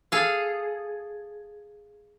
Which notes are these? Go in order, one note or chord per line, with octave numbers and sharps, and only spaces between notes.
G#4 A4 F5